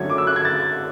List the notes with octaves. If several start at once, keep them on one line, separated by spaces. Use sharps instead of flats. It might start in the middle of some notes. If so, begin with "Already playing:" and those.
Already playing: F#2 D3 F#3 A3 C#4 G#6
D6
E6
F#6
G#6
A6